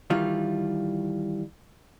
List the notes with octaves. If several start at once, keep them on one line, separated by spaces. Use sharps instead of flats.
D#3 E3 G3 F4